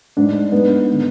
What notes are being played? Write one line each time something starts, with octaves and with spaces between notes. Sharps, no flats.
G#2 D4
G#2 B3
D3